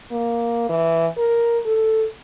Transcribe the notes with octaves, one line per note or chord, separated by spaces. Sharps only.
A#3
E3
A#4
A4